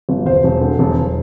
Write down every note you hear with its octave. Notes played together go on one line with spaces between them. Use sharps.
G1
E1 C5
E1
D3
E1
E1